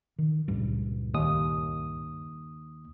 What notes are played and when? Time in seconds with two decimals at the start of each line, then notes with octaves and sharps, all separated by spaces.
0.19 D#3
0.48 C#2 G2 A#2
1.14 D#2 D#6